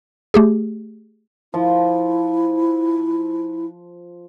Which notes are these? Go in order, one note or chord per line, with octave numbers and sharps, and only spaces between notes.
A3 G4 G#4
F3 E4